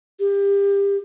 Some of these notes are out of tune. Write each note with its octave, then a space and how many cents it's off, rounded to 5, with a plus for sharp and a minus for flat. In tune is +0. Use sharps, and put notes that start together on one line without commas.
G4 +25